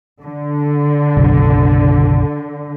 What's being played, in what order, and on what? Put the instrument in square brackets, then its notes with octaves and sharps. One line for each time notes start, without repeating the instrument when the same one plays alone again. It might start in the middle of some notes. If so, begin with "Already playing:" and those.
[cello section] D3
[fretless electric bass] F#1 B1